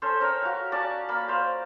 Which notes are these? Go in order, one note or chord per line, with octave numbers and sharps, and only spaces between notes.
C#4 A4 C5 C#5
C#4 A#4 C#5 G5
F#4 F5
C#4 D5 A5 C#6
A#3 B5
C5 F5